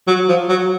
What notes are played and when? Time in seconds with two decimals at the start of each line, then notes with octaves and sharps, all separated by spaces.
0.08 F#3
0.29 F3
0.49 F#3